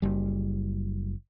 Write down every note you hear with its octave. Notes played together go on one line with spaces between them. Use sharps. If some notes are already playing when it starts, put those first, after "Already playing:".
F#1 G3